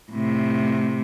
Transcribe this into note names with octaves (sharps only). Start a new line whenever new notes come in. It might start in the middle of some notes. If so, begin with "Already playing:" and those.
A2 C3